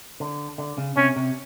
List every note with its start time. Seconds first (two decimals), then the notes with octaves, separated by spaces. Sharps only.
0.20 D3
0.58 D3
0.78 C#3
0.97 C3 C#4
1.16 C3